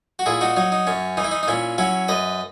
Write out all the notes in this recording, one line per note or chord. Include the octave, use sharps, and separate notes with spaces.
F#4
A#2 E4 G#4
D#4 F#4
F#3 D#4
D#4
F#2 C#4
E3 D#4
E4
D#4
D#4
A#2 C#4 E4
F#3 C#4 E4
F#2 B4 D#5